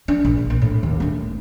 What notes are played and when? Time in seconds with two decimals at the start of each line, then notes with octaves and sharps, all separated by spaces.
0.08 D4
0.25 A#1
0.50 A#2
0.62 A2
0.83 D#2
1.00 A3 D4